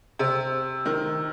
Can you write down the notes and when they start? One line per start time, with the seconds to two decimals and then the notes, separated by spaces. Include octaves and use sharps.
0.19 C3
0.86 D#3